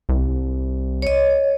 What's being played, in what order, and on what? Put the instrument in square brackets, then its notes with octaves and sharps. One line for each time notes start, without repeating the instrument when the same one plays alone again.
[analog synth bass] C2
[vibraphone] C#5 D#5